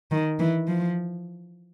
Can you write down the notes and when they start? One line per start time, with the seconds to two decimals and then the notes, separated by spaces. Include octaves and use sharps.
0.11 D#3
0.39 E3
0.68 F3